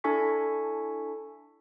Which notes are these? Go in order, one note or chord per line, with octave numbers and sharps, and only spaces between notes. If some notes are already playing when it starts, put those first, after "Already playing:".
D4 E4 A4 G#5 C#6 B6